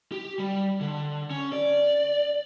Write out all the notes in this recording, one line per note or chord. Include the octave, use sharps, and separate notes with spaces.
G4
G3
D3
C#4
D5